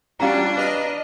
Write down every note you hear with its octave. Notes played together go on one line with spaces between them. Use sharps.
G3 C#4 D4 F4 F#4 F5 A#5
B4 D#5 F6 F#6